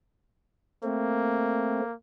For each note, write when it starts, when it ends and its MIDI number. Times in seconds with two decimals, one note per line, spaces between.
0.84 1.81 57
0.84 1.94 58
0.84 1.81 60